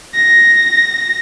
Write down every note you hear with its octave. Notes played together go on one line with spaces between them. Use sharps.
A#6